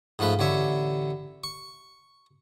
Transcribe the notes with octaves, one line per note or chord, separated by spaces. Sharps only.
G#2 F3 A3 B4
A1 D3 C#5 E5
C#6